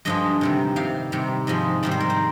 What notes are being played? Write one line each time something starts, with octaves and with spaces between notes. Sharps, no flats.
G2 D3 F3 G#3 D#5
C3 D#3 G3
C3 G3 F5
C3 D#3 G3
G#2 F3 G#3 D#5
G#2 D#3 G3 D5
C5
A#4
C5